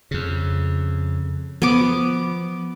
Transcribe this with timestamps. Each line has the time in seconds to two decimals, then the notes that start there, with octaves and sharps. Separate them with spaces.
0.11 F2 C#3
1.62 F3 B3 D6